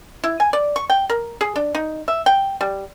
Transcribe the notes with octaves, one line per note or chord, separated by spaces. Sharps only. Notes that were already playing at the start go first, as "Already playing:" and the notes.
E4
G#5
D5
C#6
G5
A#4
G#4
D4
D#4
E5
G5
G3